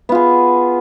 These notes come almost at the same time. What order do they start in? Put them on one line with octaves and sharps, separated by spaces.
B3 F4 G#4